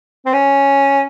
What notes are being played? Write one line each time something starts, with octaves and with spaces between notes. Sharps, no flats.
C4
C#4